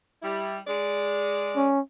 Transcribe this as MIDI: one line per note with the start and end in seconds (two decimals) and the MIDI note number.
0.23 0.58 55
0.23 0.58 64
0.68 1.69 56
0.68 1.69 74
1.56 1.80 61